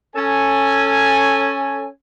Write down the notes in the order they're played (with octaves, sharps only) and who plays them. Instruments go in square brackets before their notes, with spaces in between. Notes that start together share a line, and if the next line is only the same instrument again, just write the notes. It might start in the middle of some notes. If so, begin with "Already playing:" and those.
[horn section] C#4 A4 G#5